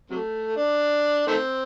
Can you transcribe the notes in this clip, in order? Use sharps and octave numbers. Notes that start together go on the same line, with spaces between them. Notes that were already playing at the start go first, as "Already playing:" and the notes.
C3 F#3 A3
D4
D#3 A3 C4